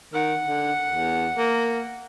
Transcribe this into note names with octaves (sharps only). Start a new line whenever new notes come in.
D#3 F#5
D3
E2
A#3